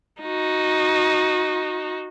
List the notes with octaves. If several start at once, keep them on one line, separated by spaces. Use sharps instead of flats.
D#4 F#4